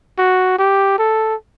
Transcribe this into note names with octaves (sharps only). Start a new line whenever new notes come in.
F#4
G4
A4